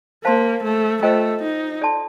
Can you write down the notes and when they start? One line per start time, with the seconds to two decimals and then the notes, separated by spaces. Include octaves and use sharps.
0.24 A#3 C5 F5 A5 C6
0.63 A3
1.02 A3 F4 A4 C5 D#5 G5
1.42 D#4
1.82 A4 D5 A5 C6